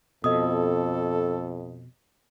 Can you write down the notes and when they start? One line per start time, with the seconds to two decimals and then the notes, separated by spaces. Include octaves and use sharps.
0.24 F2 B2 A4 D#5 D#6